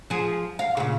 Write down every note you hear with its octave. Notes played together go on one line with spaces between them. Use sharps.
F3 G#4
F5
A#2 C#3